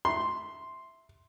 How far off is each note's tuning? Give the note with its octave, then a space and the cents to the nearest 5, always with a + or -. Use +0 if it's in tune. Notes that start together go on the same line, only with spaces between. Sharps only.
E5 +0 C6 +0